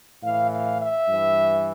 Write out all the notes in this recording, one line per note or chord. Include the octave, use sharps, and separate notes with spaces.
A2 E3 F5
F5
E5
G2 E3